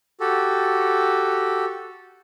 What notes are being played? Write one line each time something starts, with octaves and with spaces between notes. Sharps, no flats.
F#4 G4 A4